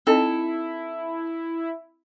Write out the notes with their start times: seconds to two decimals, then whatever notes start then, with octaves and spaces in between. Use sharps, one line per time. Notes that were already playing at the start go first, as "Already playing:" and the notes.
0.07 C4 D#4 E4 A4 D#5